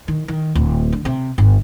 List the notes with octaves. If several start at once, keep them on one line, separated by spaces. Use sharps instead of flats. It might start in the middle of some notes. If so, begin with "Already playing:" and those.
D#3
D#3
D1
D3
C3
G1